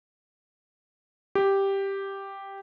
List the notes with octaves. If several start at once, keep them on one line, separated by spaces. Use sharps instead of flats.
G4